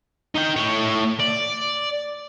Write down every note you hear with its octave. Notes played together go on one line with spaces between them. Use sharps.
D#4 G5
A2 C#5
D5